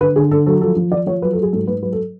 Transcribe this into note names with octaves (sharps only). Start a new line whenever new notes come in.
D3 B4
D3 G#4
D3 A4
F#3 A4
F3 A4
F3
F3 D5
F3 C#5
F#3 B4
A4
F#3
G#4
G#2 A4
G#2 B4
F#3 B4
A4